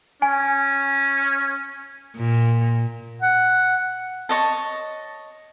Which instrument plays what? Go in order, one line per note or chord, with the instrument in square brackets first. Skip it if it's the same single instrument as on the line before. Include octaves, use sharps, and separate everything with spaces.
[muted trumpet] C#4 [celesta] G#5
[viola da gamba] A#2
[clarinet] F#5
[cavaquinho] C#5 D#5 A5